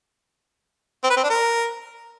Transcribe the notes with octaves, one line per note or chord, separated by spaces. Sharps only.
C4
B4
C4
D4
A#4